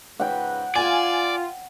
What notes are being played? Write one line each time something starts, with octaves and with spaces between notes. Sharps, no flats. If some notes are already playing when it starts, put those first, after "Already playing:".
G#2 C#3 B4 F#5 G5
F4 D5 G#5